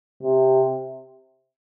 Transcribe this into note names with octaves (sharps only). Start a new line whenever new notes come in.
C3